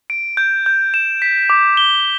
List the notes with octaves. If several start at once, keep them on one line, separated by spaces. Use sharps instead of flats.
D7
G6
G6
E7
B6
D6
G7